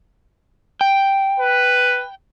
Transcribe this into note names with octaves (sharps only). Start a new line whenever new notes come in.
G5
B4